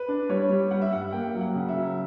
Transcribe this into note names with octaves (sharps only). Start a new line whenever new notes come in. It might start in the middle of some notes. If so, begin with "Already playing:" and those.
Already playing: B4
D4
G3 C#5
G3
G3 F#5
E5
G2 F#5
A#3 G5
F#3
F#5
C#3
E5
F#3